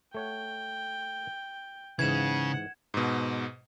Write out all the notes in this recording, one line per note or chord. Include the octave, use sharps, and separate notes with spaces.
A3 C#5 F#5 G5
G#2 C#3 E3 F#5 G#6 E7
G#2 B2